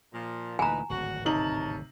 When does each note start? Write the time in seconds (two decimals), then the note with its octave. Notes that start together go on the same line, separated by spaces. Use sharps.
0.13 A#2 F3
0.59 D2 A#2 E3 D#4 B4 G#5 A#5
0.90 D1 G#1 F#4
1.25 C3 D#4 A#4 C#5 A5 F#7